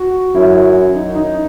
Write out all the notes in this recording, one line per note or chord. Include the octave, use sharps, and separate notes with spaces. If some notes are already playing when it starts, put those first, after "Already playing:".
Already playing: F#4
F#2 E4
D#4
D#4